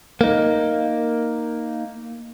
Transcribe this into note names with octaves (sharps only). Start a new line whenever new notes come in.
A#3 D#4